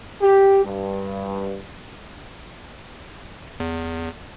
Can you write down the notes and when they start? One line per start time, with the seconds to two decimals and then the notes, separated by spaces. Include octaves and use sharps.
0.21 G4
0.65 G2
3.60 E2